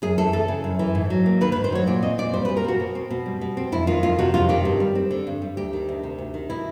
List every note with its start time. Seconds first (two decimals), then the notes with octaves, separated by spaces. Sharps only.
0.02 F#2 G#4
0.18 E3 A4
0.33 A3 A4
0.48 C#3
0.64 F#2
0.79 E3
0.95 G#2
1.10 F#3
1.26 A#3
1.41 D#3 B4
1.52 B4
1.56 G#2
1.64 C5
1.72 F#3 C#5
1.87 A#2 D5
2.02 C4 D#5
2.18 A#2 D5
2.34 G3 C5
2.45 B4
2.49 A#2
2.57 A#4
2.64 C4 F#4
2.80 B2
2.95 C4
3.10 B2
3.26 G3
3.41 B2
3.57 C4
3.72 F2 E4
3.87 D#3 F4
4.03 F2 F4
4.19 C3 F#4
4.34 F2 F4
4.49 D#3 G4
4.65 G2
4.80 G3
4.95 C4
5.11 D3
5.27 G2
5.42 G3
5.57 D2 G4
5.73 D#3
5.89 D2
6.03 C3
6.18 D2
6.34 D#3
6.49 B2 E4